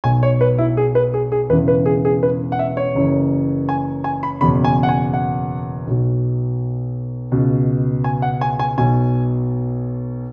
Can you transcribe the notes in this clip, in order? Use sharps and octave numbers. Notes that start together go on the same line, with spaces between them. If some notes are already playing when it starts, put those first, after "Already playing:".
B1 B2 G#5
C#5
B4
E4
G#4
B4
G#4
G#4
E1 E2 C#3 E3 B4
B4
G#4
G#4
B4
F#5
E5
C#5
F#1 F#2 E3
G#5
G#5
B5
F#1 E2 B2 B5
G#5
F#5
G#5
F#5
B1 B2
C#2 B2
G#5
F#5
G#5
G#5
B1 B2 G#5